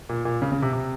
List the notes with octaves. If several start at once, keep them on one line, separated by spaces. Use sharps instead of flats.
A#2
A#2
C#3
C#3
C3
C3